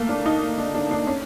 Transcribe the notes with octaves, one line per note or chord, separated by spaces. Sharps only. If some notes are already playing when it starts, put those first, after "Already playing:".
Already playing: A3 A#3
D4
D#4
D4
D4
D4
C#4